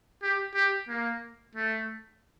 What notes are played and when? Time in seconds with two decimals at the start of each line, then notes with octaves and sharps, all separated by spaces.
0.22 G4
0.55 G4
0.89 A#3
1.55 A3